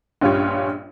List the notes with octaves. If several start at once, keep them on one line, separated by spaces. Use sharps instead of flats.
A#1 G2 C#4 F4 G4 C#5